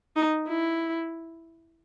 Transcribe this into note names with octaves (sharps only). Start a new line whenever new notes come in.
D#4
E4